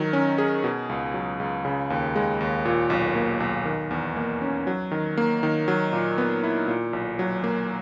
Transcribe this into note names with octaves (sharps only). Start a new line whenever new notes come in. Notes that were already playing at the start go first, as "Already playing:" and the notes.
Already playing: D#3 F#3
C#4
G#4
B2
C#2
F#3
C#2
C#3
D#2
G#3
D#2
A#2
B1
A#3
B1
D#3
E2
A#3
C#4
F#3
D#3
A#3
D#3
F#3
A#2
B3
E4
A#2
B1
F#3
A#3